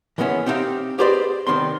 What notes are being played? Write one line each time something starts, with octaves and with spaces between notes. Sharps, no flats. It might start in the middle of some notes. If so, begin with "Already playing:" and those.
E3 G#3 B3 C#4 E5
C4 D#4 E4 G4 E5 F5
G4 G#4 B4 C5 D5 D#5
C2 G#2 D#3 B3 C4 C6